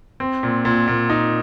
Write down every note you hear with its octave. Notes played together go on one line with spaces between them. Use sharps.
C4
A#2
A#2
A#2
D#4